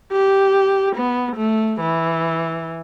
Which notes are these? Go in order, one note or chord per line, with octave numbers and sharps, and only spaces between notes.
G4
B3
A3
E3